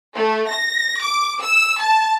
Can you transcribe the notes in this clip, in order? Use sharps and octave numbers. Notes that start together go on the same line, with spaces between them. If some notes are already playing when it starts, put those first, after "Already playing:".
A3
A#6
D6
E6
A5